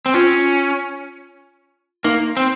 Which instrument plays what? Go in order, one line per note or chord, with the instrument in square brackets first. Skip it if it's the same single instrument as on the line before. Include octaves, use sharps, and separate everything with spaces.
[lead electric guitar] C4
[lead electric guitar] C#4 [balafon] F4
[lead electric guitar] A#3 [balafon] D#4
[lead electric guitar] C4